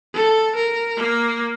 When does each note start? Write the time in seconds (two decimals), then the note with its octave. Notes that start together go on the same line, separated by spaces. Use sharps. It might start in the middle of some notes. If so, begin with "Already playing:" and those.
0.14 A4
0.56 A#4
0.97 A#3